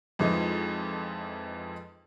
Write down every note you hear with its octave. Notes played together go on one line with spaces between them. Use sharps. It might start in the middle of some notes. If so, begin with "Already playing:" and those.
F2 E3 F3 G#3 D#4